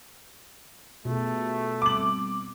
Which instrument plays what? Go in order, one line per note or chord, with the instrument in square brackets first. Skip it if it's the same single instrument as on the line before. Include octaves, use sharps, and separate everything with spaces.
[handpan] B2 [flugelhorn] A3 [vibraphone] F4 G#4
[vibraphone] G3 C4 [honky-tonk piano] D6 F#7